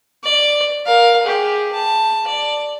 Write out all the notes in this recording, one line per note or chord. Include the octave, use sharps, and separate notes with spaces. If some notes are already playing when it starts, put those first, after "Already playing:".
D5
A#4 F5
G4 G#4
A5
D5